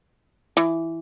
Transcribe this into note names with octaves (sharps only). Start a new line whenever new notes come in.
E3